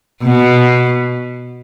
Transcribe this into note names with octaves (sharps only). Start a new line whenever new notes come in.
B2